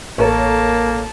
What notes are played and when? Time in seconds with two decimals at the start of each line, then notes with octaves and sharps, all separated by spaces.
0.18 A1 A#3 A4 A#4 C#5 A5